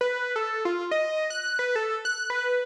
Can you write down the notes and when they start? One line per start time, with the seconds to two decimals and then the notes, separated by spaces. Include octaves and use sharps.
0.01 B4
0.36 A4
0.65 F4
0.91 D#5
1.30 F#6
1.59 B4
1.76 A4
2.05 F#6
2.30 B4